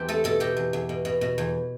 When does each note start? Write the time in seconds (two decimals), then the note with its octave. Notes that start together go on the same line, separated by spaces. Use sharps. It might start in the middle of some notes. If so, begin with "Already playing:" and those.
Already playing: E2 C4 G4
0.09 A3 A4
0.24 B2 A4
0.40 B2 G4
0.57 E2
0.73 E2
0.89 B2
1.05 B2
1.21 B2
1.38 E2